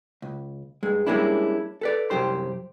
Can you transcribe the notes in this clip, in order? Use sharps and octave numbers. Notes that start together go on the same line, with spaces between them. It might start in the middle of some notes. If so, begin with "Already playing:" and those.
C#2
G2 G#3
G3 G#3 A#3 C#4 D4 E4
A4 B4 D5
C2 F#2 G4 C5 C6